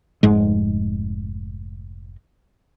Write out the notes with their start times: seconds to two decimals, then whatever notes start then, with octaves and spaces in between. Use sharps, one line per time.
0.23 F1 G#2 G#3